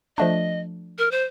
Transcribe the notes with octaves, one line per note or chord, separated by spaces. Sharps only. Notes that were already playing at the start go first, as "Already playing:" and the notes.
F3 A3 D4 D#5
A#4
C5